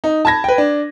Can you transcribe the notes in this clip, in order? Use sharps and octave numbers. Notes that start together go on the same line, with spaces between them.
D#4
A5 B5 G#6 A#6
B4 G5
D4